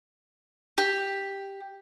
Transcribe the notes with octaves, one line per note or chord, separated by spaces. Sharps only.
G4